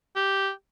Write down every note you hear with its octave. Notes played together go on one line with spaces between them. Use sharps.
G4